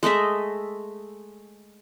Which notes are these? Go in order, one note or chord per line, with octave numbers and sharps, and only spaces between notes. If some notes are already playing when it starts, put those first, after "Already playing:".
G#3 A3 D#5 E5